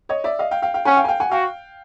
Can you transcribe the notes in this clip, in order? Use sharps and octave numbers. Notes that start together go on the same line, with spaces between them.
C#5 D#5
D5 E5
D#5 F5
F5 G5
F5 G5
F5 G5
C#4 F#5 G#5
F5 G5
G#5
F5 G5
F#5 G#5
F#4 F5 G5